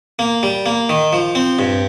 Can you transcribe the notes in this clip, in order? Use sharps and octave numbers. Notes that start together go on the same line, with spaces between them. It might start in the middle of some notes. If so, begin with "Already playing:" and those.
A#3
G3
A#3
D#3
F3
C4
G2